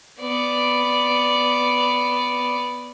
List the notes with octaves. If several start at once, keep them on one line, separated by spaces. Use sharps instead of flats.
B3 D5